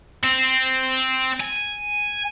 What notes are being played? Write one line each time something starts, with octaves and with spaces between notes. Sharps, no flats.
C4
G#5